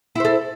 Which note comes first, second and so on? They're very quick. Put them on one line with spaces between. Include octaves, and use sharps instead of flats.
E4 C5 A4